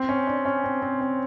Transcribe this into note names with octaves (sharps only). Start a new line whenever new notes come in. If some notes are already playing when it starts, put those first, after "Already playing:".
Already playing: C4
C#4
D4
C#4
C4
C4
C4